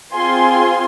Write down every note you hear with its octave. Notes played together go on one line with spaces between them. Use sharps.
C4 F4 G#4 G#5 C6